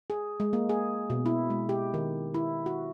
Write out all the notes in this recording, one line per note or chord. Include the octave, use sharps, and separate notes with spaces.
G#4
G#3
A#3
G#4
B2
E4
G#3
G4
D#3
E4
F#4